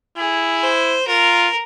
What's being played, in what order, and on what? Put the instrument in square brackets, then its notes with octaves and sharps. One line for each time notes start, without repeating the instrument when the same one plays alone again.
[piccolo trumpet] E4 [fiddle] G#4
[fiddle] C5
[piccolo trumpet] F4 [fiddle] A#4